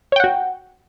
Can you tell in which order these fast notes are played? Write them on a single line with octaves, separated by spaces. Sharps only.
C#5 G5 F#5 F#4